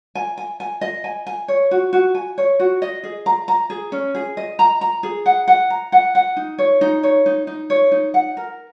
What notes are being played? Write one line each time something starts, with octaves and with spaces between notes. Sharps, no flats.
G#5
G#5
G#5
D#5
G#5
G#5
C#5
F#4
F#4
G#5
C#5
F#4
D#5
G#4
A#5
A#5
G#4
C#4
G#4
D#5
A#5
A#5
G#4
F#5
F#5
A#5
F#5
F#5
D#4
C#5
D#4
C#5
D#4
D#4
C#5
D#4
F#5
A#4